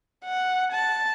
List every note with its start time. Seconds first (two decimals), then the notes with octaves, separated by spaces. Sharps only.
0.25 F#5
0.72 A5